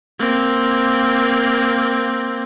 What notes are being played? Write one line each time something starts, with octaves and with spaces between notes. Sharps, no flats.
A#3 C4